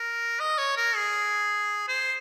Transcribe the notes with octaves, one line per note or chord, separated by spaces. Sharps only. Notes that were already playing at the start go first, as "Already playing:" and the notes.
Already playing: A#4
D#5
C#5
A#4
G#4
C5